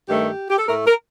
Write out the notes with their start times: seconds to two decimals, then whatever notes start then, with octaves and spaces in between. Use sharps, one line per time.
0.08 G2 D#3 A3 G4
0.50 G4
0.57 A4
0.67 A2 A3 A#4
0.86 A#4